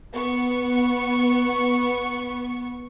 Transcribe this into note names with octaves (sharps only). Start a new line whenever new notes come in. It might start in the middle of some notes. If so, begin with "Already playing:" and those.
B3 C#6